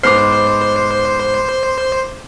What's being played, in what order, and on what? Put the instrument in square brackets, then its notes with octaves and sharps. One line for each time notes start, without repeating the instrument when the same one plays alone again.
[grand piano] G#2 B3 F6 [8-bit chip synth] C5 [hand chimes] D6 C7